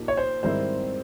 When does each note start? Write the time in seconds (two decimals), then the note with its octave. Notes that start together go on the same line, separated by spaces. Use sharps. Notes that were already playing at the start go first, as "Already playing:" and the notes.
Already playing: A#2 F3 A#3 D#4 G4
0.08 C#5
0.17 C5
0.43 G#2 D#3 G3 C4 E4 C5